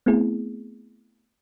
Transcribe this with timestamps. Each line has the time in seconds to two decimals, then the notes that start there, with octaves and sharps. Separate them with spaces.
0.06 A3 B3 C4 E4 G#4